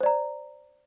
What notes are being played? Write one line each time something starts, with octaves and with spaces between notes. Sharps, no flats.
C5 D5 A#5